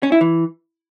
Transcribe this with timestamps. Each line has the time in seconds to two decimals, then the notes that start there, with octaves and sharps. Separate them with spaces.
0.03 C#4
0.12 E4
0.21 E3